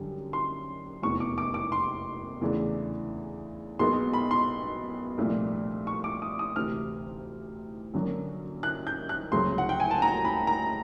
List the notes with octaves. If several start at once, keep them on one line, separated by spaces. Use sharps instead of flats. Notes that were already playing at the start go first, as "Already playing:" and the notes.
Already playing: F#2 D3 G3
C6
F1 E2 B2 C#6
D6
D6
D6
C6
E2 C#3 E3 A3 D4
B1 B2 G#3 B3 C6
B5
C6
C2 A#2 F3 A3 D4
C#6
D6
D#6
D#6
D2 C3 E3 F6
F#2 D3 F#3 A#3
F#6
G6
F#6
D2 C#3 F#3 A3 C6
F#5
G5
G#5
A5
A#5
B5
A#5